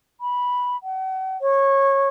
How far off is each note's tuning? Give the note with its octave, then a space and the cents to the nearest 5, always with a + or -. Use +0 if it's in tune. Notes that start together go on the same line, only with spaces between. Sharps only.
B5 -10
F#5 +40
C#5 -20